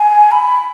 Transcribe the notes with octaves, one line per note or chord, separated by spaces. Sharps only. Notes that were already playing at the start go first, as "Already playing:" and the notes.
Already playing: G#5
B5